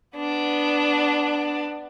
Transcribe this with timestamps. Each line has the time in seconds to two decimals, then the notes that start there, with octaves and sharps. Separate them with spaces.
0.16 B3 D4